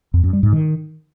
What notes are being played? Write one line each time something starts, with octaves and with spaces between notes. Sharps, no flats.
F2
F#2
G3
G#2
D#3